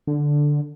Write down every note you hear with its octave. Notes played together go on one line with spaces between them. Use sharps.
D3